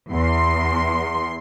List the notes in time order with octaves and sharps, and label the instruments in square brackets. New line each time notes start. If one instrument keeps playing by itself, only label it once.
[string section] E2 C6